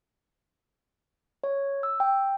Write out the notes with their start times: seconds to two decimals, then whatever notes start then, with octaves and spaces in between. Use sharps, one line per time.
1.44 C#5
1.83 E6
2.00 G5